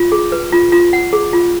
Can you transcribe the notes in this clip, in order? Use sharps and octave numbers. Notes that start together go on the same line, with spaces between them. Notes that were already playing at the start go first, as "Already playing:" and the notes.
Already playing: F4
G#4
B4
F4
F4
F#5
G#4
F4